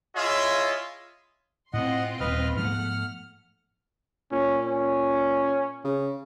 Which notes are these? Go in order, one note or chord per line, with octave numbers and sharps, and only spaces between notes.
E4 F4 G#4 C#5 D#5 E5
A2 C4 F4 D#5 F#5 C6
D#1 B4 D#5 F6
G#2 F3 A3 B3 F#5 F6
A#2 C#4
C#4
C#3